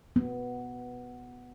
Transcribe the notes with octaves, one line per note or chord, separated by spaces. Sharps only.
B3